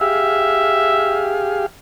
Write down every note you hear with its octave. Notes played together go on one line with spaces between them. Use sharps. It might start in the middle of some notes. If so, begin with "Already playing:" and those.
G4 G#4 E5 F5